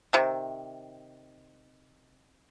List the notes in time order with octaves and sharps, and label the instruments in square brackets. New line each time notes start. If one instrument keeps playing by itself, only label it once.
[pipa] C3 D#3